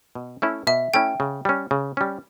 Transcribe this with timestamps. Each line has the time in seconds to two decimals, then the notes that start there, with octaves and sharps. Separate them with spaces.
0.15 B2
0.42 A3 C#4 E4
0.67 B2 E5
0.94 A3 C#4 E4 G5
1.20 C#3
1.45 G3 C#4
1.71 C#3
1.97 G3 C#4